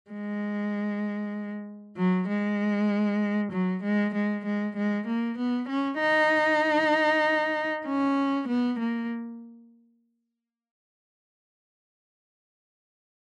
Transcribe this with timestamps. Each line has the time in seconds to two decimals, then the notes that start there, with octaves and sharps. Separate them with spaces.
0.11 G#3
1.96 F#3
2.29 G#3
3.52 F#3
3.83 G#3
4.14 G#3
4.45 G#3
4.76 G#3
5.07 A#3
5.38 B3
5.68 C#4
6.00 D#4
7.86 C#4
8.48 B3
8.79 A#3